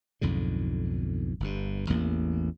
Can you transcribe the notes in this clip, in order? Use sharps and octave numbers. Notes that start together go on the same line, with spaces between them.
B1 F2 G#2 D3
G1 G2
A1 E2 A#3